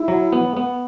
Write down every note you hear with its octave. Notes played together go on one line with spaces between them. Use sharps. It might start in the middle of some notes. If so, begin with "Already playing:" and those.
Already playing: E4
F#3
B3
B3